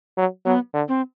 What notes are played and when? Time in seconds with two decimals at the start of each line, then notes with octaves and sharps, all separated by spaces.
0.18 F#3
0.45 F#3 B3
0.74 D3
0.88 C4